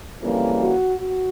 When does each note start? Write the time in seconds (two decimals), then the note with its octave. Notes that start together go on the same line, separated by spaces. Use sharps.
0.21 F2 C#3 E3 G3 A#3
0.58 F#4
0.96 F#4